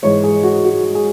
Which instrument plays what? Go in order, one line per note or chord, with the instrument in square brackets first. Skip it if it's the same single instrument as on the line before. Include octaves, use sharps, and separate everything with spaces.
[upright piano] G#2 E3 G#3 C#5
G#4
F#4
F#4
G#4